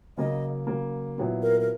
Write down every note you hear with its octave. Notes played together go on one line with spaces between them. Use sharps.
C#3 F#3 A#3 D#5
C#3 F#3 A#3
A#2 F#3 B3 E4
A#4
A#4